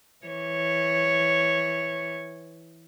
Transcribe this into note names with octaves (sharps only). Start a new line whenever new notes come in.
E3 C#5